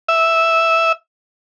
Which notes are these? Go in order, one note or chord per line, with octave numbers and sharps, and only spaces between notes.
E5